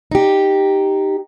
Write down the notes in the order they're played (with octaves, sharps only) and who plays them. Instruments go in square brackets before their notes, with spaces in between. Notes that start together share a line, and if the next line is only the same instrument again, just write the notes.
[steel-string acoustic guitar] D#4 G4